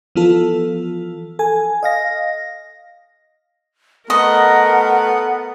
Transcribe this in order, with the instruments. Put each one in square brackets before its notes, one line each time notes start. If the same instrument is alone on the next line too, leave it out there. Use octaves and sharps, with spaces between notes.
[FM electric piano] E3 F3 B3 F4 A4
A4 G#5
D#5 F5 A#6
[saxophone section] A3 B3 [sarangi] A#4 [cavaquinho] D#5 [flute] F#5